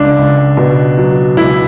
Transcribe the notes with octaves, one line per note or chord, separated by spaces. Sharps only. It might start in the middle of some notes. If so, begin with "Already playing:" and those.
Already playing: C#2 D4
C#2
B2
F#3
C#2 E4